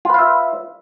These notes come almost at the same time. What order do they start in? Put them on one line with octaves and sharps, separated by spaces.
F4 B4 F5 E5